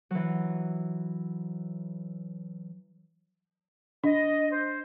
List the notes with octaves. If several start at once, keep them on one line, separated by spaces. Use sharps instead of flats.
E3 F#3
D4 D#5
C5